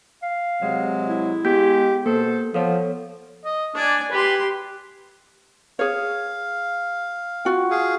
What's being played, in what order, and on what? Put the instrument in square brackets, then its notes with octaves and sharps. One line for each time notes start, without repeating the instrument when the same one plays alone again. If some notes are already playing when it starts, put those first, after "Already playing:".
[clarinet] F5
[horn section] C3 F#3 G#3
[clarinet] E4
[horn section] G#3 G4 [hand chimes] B3 G6 B6
[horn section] B2 A4 [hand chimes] A#3 [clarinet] C5
[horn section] F3 [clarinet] B3 [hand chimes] A4 C#5
[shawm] D#5
[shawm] D4 [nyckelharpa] D5 G#5
[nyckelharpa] G4 C6 [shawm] B4
[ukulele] G#4 C#5 [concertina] F5
[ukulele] F4 F#4 G5
[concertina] G#4 F5